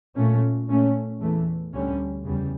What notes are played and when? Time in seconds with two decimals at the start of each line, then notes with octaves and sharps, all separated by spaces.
0.16 A#2 A3 C#4
0.68 A#2 A3 C#4
1.21 E2 E3 A3
1.73 D2 D3 G3 C#4
2.24 E2 C#3 G3